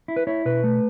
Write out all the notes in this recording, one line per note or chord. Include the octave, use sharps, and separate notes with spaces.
E4
B4
E4 C#5
B2 B4
A3